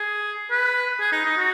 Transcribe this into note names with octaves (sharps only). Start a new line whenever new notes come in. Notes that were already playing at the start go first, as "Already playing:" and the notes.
Already playing: G#4
B4
G#4
D#4
D#4
F#4